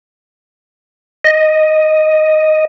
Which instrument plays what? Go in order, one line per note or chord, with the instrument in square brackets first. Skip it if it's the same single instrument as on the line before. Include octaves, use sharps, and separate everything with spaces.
[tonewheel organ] D#5